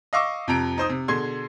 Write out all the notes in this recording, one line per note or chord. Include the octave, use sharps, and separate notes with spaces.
D#5 F5 C#6 D6 E6
F2 C3 A#5 D7
D#4 C5 D#6
C3
B2 D3 G#4 C6 G#6